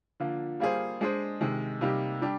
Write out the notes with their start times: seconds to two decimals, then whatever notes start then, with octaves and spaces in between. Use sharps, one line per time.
0.20 D3 F3 A#3
0.60 G3 A#3 F4 G#4 C5
1.01 G#3 D4 G#4 C5
1.41 C3 D#3 G#3
1.81 C3 G3 A#3 D#4 G4
2.21 G3 D4 G4